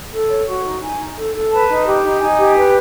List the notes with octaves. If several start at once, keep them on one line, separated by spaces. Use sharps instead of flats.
A4
C#5
F#4
D#4
D#4 G#5
D#4
A4
A4
B4 A5
D#4
G4
D#4
D#4 G#5
G4
B4